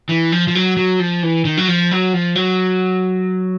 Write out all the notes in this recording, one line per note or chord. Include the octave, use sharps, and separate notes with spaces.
E3
F3
F3
F#3
F#3
F3
E3
D#3
F#3
F3
F#3
F3
F#3